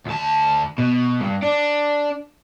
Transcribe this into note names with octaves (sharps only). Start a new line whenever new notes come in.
D2 A5
B2
G2
D4